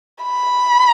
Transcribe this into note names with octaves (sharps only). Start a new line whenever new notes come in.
B5